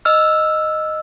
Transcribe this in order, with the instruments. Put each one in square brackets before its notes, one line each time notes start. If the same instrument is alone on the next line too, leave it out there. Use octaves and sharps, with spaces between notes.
[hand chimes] D#5 E6 F6